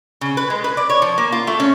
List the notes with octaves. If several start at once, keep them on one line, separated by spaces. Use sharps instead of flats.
C#3
B4
G#3
B4
D5
C#5
F3
A#3
F4
A3
C#4